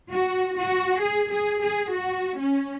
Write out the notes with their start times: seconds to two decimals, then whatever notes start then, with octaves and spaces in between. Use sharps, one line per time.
0.12 F#4
0.58 F#4
1.02 G#4
1.32 G#4
1.62 G#4
1.93 F#4
2.37 C#4